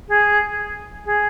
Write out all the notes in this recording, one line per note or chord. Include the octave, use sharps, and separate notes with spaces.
G#4
G#4